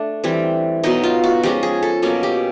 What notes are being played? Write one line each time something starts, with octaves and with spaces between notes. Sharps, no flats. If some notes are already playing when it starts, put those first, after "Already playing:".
Already playing: A3 D4
E3 G3 C4
B2 F#3 B3 D#4
F4
F#4
F3 G#3 C#4 G4
G#4
A4
B2 F#3 A#3 C#4
G4